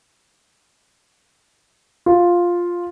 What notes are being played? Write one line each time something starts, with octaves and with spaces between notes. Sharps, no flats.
F4